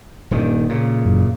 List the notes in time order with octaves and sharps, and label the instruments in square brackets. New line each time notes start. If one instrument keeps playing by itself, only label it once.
[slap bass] D#1 G2 D#3
A#2 C#3
[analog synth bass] F#1